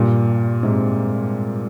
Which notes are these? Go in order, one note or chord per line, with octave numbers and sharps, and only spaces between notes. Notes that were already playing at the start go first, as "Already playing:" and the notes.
Already playing: G2 A#2
G#2 C3